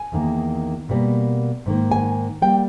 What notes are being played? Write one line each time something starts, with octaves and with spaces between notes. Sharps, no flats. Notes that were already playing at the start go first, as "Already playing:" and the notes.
Already playing: G#5
E2 D#3 A#3
B2 G3 A#3
G#2 D#3 A#3
G#5
G3 A#3 G5